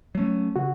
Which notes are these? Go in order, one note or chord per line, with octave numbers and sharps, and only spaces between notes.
F#3 A3 C#4
C#3 F#4